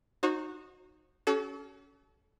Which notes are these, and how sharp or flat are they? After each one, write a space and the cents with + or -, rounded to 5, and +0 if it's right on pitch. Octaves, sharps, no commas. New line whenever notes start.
D#4 -15 F#4 -15 C5 +40
C#4 +20 F#4 +40 A4 -35